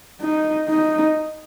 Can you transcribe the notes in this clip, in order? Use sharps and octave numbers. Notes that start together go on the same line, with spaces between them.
D#4
D#4